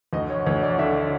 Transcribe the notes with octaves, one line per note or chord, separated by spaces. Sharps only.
D2 D#5
C#5
D2 C#5
D5
D3 E5